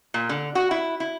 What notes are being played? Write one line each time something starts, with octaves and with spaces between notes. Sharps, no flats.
A#2
D3
F#4
E4
E4